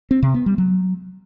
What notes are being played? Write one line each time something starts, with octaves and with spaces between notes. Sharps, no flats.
C4
C3
B3
G3
F#3